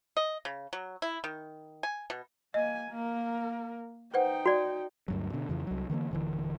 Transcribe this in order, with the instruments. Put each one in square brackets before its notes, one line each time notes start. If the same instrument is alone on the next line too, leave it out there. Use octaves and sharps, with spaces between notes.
[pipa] D#5
C#3
F#3
E4
D#3
G#5
B2
[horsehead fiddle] A#3 G#5 [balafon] D#5
[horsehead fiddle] A#3 A#4
[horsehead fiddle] D#4 G5 [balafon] B4 C5 F#5
[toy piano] F#4 D5
[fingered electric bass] D2 G2 F#3
B2 D3
F2 C#3 E3 F3
C2 F#3
D3 E3 A3 A#3
D#1 D3 E3